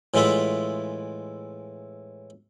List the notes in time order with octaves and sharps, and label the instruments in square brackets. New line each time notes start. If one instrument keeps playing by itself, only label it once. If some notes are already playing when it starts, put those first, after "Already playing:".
[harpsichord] A2 E3 G#3 E4 F4 E5